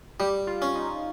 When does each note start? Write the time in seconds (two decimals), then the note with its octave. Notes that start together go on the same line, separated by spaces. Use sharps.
0.20 G3 G4
0.47 F4
0.62 C#4
0.75 D#4